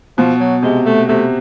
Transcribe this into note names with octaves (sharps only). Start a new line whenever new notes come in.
B2 F3
F#3
C3 G#3
A3
C3 A3